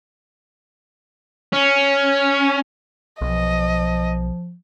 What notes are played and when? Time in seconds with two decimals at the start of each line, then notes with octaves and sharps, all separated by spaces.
1.53 C#4
3.21 B1 F3 D#5